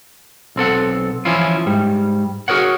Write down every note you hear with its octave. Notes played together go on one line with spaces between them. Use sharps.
B1 C4 A4 F#5
E3 F3 C#4 E4 F4
G#2 G3
F#4 G#4 A#4 C#5 F#5